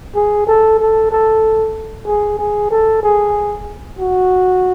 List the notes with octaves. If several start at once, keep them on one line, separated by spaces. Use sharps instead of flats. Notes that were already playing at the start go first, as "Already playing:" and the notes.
G#4
A4
A4
A4
G#4
G#4
A4
G#4
F#4